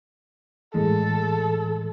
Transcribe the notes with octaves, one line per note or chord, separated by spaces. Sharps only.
A2 E3 G#3 A4